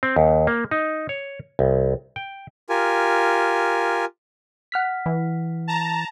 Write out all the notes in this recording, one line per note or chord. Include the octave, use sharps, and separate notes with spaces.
C4
D#2
A#3
D#4
C#5
C2
G5
F4 G4 A#4 G#5
F#5 F6 B6
E3
A5 A#5